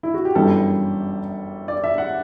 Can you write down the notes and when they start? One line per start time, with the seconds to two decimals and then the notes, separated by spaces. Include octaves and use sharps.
0.03 E4
0.14 F#4
0.25 G4
0.35 G1 F#2 E3 G3 A4
1.68 D5
1.84 E5
1.98 F#5